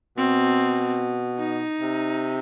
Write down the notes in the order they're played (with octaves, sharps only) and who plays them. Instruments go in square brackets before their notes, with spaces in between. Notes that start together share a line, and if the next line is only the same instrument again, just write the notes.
[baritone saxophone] B2 [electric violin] C4
[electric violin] D#4
[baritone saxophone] C3